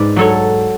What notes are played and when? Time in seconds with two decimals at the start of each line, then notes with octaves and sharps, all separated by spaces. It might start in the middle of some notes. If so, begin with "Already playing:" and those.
Already playing: G#2 B4 D5
0.16 F#3 A4 C#5